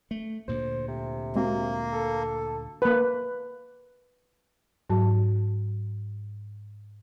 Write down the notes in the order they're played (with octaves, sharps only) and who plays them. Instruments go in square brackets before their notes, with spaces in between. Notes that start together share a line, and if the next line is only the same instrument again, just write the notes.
[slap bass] A3
[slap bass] D2 A#2 [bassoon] C5
[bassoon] C3
[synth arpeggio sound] G#3 C4 F#4 [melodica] A#3
[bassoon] A4
[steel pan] A#3 B4
[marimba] G#2 F#3 F#4 A5